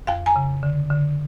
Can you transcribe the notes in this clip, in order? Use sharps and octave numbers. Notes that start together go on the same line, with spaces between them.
F2 F5 G5
G#5 A#5
C#3
D3
D3